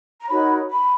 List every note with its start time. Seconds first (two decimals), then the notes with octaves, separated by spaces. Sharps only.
0.20 A#5
0.28 D#4 F#4 A#4 C#5 B5
0.70 B5